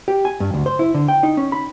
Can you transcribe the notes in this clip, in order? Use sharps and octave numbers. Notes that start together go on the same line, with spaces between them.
G4
G#5
G2
D2
C5
E4
D3
G5
D#4
C#4
B5